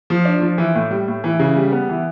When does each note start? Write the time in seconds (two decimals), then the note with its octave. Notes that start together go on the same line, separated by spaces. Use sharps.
0.10 F3
0.25 D4
0.41 F3
0.58 E3
0.75 A2
0.91 G3
1.08 A2
1.24 E3
1.39 C#3
1.57 G3
1.72 B3
1.89 E3